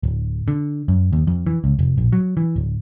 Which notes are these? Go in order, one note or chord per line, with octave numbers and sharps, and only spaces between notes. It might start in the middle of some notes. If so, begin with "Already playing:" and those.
D1
D3
F#2
D#2
F2
E3
C#2
F1
A#1
F#3
E3
D1